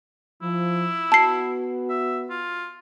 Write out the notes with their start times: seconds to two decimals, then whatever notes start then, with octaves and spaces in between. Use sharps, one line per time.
0.42 F3 E4
1.12 B3 F#4 A5 C7
1.89 E5
2.30 F4